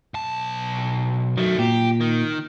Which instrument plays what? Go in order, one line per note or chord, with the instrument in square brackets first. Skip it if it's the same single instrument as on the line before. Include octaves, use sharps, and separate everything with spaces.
[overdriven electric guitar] B1 A5
[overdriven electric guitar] D#3 A3 [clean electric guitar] F#3
[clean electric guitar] A#2 [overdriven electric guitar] G4
[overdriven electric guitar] D#3